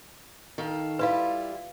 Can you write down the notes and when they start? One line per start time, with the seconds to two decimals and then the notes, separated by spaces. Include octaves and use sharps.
0.58 D#3 A4 F5
0.99 G3 E4 F4 B4 F5